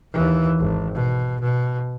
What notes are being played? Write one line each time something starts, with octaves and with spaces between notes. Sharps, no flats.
D#2 E3
G#1
B2
B2